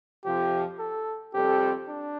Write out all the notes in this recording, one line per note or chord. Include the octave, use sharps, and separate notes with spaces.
F2 C3 F3 G4
A4
F2 C3 G3 C4 G4 A4
D4